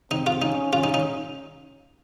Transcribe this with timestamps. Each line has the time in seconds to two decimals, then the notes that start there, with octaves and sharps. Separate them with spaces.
0.11 C4 D#4
0.27 F4
0.42 C#4 D#4
0.73 C#4 F4
0.84 D#4
0.94 D#4